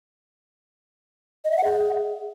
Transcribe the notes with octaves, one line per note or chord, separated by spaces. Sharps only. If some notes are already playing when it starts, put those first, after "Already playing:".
D#5
E5
F#5
G#4